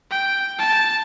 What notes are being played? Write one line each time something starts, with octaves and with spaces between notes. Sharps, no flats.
G5
A5